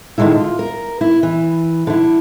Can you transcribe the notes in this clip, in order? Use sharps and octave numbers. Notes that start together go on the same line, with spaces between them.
D3 D#3 F#3 G#3 E4
F4
A#4
E4
E3
D3 E4